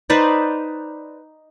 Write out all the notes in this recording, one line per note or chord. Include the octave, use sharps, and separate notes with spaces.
D#4 B4 C5 D5